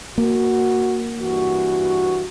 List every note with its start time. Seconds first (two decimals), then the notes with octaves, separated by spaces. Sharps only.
0.18 A#3 F#4
1.19 G2 E3 F#4